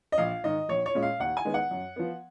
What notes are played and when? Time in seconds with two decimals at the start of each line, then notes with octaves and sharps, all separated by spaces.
0.12 D#5
0.18 A#1 F5
0.44 G#2 D#3 D#5
0.69 A#1 C#5
0.86 C#5
0.95 A#2 G#3 C#4
1.02 F5
1.20 D#2 F#5
1.37 G#5
1.45 D#3 G#3 B3
1.54 F#5
1.71 F#2
1.96 F3 B3